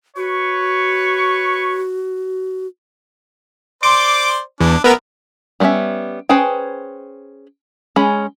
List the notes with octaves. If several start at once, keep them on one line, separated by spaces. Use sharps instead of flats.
F#4 B4 C#5 C#6
C5 D5 C6 D6
E2 D4
B3 A#4 B4 E5 B5
G3 G#3 B3 C#4 E5
C#4 G#4 B4 C5 G5
G#3 C#4 G#4 B5